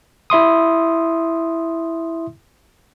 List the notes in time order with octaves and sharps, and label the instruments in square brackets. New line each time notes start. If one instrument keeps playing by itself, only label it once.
[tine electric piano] E4 E5 C6 D#6